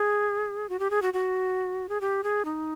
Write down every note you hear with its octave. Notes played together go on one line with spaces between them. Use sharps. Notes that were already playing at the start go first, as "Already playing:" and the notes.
Already playing: G#4
F#4
G4
G#4
F#4
F#4
G#4
G4
G#4
D#4